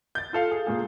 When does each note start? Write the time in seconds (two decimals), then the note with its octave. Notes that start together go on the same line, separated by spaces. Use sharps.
0.15 G6 A6
0.33 F4 A4 F5
0.51 G#4
0.67 A#2 A#3 G#4